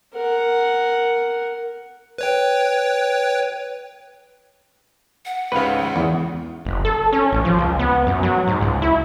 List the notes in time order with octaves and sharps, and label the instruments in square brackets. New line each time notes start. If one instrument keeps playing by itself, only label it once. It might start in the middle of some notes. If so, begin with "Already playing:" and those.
[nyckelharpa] A#4 F#5
[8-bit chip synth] B4 C#5 G5
[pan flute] F#5
[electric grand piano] C#2 G#2 C#3 [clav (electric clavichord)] B4 F5
[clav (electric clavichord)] E2
[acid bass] F#1
A4
C#4
A1
F3
C#2
B3
F#2
F#3
G#2
C#2
E4